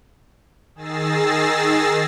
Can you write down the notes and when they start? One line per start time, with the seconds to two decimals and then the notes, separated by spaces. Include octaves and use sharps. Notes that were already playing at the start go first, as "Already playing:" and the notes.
0.75 D#3 G#4 E6 A6 A#6 C7